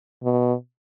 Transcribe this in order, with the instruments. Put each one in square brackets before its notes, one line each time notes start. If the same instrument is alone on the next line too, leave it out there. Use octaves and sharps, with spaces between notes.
[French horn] B2